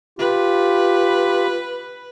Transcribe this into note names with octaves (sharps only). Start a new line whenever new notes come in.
F4 G4 B4